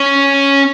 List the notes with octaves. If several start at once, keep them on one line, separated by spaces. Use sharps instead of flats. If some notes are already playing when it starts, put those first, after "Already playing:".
Already playing: C#4